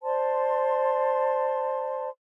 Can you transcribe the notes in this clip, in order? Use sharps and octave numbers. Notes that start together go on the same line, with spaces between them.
C5 D5 A5 C6